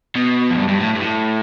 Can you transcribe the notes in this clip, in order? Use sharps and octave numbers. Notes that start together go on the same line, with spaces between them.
B2
F2
G2
G2
A2
G2
A2